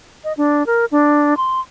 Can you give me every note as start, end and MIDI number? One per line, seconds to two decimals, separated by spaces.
0.24 0.33 75
0.37 0.66 62
0.66 0.85 70
0.92 1.37 62
1.37 1.60 84